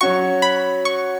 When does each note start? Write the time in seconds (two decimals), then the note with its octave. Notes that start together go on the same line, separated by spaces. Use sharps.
0.01 F#3 C#4 F#4 C#6
0.42 B5
0.85 C#6